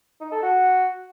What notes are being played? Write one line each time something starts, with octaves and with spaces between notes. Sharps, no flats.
D#4
A4
F#4